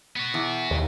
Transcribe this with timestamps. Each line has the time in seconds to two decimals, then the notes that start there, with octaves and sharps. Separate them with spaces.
0.16 B3 F#4
0.34 E2
0.71 D#2